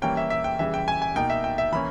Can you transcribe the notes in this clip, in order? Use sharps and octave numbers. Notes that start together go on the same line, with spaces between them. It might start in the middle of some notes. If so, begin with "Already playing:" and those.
E3 G3 A#3 C#4 G5
E5
E5
G5
C#3 E3 G3 E5
G5
G#5
G#5
B2 A#3 D#4 G5
E5
G5
E5
E3 A#3 C#4 B5